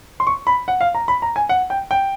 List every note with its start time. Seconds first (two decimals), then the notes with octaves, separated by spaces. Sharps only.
0.20 C6
0.27 C#6
0.47 B5
0.68 F#5
0.81 F5
0.95 A#5
1.08 B5
1.22 A#5
1.36 G#5
1.49 F#5
1.70 G5
1.91 G5